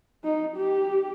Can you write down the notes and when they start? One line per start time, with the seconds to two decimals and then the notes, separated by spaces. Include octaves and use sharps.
0.24 D#4
0.57 G4